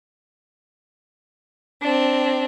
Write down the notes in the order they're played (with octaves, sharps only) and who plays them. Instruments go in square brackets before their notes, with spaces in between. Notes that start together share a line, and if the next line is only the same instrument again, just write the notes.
[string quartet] C4 D4